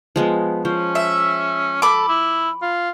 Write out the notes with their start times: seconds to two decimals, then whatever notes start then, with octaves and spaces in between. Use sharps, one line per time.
0.16 F3 G#3 B3
0.65 F3 C#4 C5
0.95 E5
1.82 A4 B5 D6
2.09 E4
2.62 F4